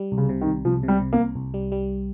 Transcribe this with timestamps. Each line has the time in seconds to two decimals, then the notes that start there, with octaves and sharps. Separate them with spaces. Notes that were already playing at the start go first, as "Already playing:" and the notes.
Already playing: G3
0.12 C2
0.18 C#3
0.29 C3
0.41 D#3
0.47 C2
0.65 C2 F3
0.83 C3
0.88 G3
1.01 C3
1.13 A#3
1.19 C2
1.36 C2
1.54 G3
1.72 G3